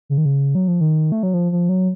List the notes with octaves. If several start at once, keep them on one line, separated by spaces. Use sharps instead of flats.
C#3
D#3
C#3
F#3
F3
D#3
A3
F#3
F3
F3
F#3